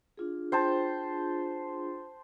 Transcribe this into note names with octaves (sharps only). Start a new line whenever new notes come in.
D4 F4 G#4
C5 G5 A5